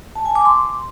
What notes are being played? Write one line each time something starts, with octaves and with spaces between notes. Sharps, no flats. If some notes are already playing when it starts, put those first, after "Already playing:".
A5
G#5
D6
C6